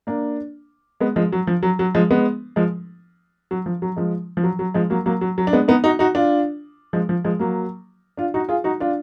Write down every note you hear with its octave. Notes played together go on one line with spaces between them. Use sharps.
A#3 D4
G#3 B3
F3 G#3
F#3
F3
F#3
F#3
F3 G#3
G#3 B3
F3 G#3
F#3
F3
F#3
F3 G#3
F3
F#3
F#3
F3 G#3
F#3 A#3
F#3 A#3
F#3
F#3
D4
G#3 B3
B3 D#4
D#4 F#4
D#4 F#4
D4 F4
F3 G#3
F3
F3 G#3
F#3 A#3
D4 F4
D#4 F#4
F4 G#4
D#4 F#4
D4 F4